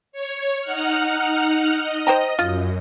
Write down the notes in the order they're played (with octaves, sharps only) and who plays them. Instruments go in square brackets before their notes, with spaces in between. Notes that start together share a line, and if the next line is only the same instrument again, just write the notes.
[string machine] C#5
D#4 F#5 F6
D#5
[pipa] C5 G5 A#5
[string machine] F#2 [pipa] F4